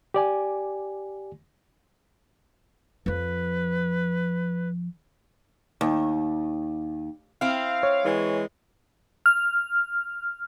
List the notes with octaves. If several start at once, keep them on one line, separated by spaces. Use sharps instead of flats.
G4 D5 G#5
F2 F3 B4
D#2
C4 E4 F5
C#5
E3 G#3
F6